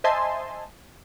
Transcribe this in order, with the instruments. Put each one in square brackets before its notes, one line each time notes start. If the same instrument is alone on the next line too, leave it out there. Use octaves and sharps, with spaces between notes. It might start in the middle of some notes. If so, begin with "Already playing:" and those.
[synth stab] C5 D#5 E5 G#5 A5 C6